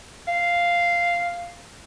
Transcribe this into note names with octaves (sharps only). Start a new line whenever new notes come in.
F5